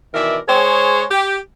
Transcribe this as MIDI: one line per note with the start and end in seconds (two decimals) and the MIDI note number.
0.14 0.37 47
0.14 0.37 51
0.14 0.37 52
0.14 0.37 70
0.14 0.37 74
0.14 0.37 76
0.48 1.03 56
0.48 1.03 68
0.48 1.03 72
0.48 1.03 73
1.10 1.37 67